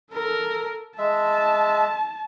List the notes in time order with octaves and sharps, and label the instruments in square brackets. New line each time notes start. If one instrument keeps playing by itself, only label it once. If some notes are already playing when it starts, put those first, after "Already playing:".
[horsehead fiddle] A4 A#4
[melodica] G#3 E5 [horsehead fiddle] A5